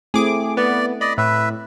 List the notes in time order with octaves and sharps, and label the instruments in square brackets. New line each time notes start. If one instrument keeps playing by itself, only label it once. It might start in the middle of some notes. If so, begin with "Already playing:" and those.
[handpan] A3 C4 E4 [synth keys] G#4 D6
[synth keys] B3 [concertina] D5
[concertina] D5 D#5 [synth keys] B5
[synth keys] A2 [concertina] B4 E5